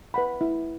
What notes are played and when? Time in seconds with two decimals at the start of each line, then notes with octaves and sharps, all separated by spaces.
0.14 B4 F#5 B5
0.41 E4